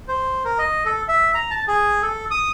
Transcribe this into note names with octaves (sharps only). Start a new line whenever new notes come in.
C5
A#4
D#5
A4
E5
A#5
A5
G#4
A4
D#6